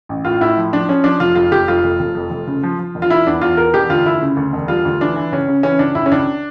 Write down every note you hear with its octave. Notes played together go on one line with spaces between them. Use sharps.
A1
A2 F4
A2 E4
F3
F3 D4
F3 C#4
F3 D4
F1 F4
F2 F4
F1 G4
F2 F4
F1
F1
F2
F1
C#3
F3
F3
E1
F4
E1 E4
E2 D4
E2 F4
E2 A#4
E1 G4
D2 F4
D2 E4
C#3
D2
E1
G3 F4
D2
E3 D4
E3
C#2 C#4
C#3
E3 C#4
C#2 D4
C#2 E4
C#4
C#2 D4